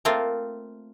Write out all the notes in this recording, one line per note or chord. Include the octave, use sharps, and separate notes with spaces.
A3 A#3 C4 F4